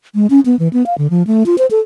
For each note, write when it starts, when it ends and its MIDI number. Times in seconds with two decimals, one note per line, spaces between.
0.15 0.27 56
0.30 0.40 61
0.46 0.58 59
0.59 0.68 52
0.73 0.85 59
0.86 0.96 77
0.98 1.07 50
1.10 1.23 53
1.27 1.44 57
1.46 1.56 65
1.58 1.66 72
1.71 1.80 69